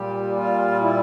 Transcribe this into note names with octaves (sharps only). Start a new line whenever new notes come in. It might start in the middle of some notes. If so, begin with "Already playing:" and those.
Already playing: A#2 G3 G4
F4
E4